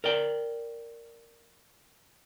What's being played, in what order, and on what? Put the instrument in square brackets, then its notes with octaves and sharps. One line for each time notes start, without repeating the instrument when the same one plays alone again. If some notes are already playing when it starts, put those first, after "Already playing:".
[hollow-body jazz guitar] A#4 D5 G5